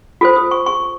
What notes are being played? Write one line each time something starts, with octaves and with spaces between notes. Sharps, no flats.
F4 A4 C5 D#6
D#6
C#6
C#6